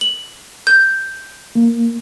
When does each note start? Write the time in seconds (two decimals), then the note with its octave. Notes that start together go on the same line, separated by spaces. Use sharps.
0.01 F#7
0.67 G6
1.55 A#3